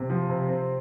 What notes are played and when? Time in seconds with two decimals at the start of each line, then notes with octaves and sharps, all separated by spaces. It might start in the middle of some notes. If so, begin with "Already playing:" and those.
Already playing: C3
0.10 F3
0.30 C3
0.48 C4